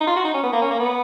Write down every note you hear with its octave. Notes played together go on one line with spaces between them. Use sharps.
D#4
F4
F#4
D#4
C#4
B3
A#3
C#4
A#3
B3